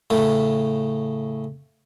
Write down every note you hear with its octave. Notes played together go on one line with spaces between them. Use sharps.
A2 C#3 A3